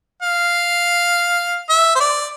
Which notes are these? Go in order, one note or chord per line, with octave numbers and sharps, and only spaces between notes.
F5
E5
C5
D5